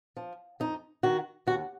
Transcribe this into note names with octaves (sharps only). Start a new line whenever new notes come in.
F3
F2 D#4
D#3 F#4
D#2 F#4